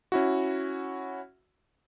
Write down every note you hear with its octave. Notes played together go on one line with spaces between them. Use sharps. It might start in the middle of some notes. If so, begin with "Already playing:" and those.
C#4 E4 F#4